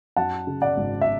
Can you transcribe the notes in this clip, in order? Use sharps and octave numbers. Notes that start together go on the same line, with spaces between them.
F#2 F#5 A5
C#3
D5 F#5
G#1
E5